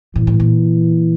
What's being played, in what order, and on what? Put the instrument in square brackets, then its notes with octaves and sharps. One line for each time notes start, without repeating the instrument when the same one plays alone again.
[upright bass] A#2 [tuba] E3
[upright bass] A2
A#2